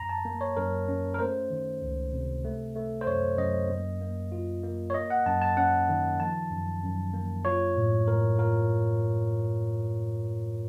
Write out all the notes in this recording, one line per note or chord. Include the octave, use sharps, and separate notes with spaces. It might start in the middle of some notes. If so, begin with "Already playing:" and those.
Already playing: F#2 A#5
A5
A#3
C#5
F#2 A#4
C#4
A#4
A3 C5
D#3
C#2
C3
A3
A3
C5
F#2 C#5
F#2 D#5
A#3
A#3
F4
A#3
C#5
A#3 D#5
F#5
F#2 A5
A5
C#4 F#5
D#3
F3 A5
F#2
F#2
A#3
F4 C#5
A2
A2 A#4
F4 A#4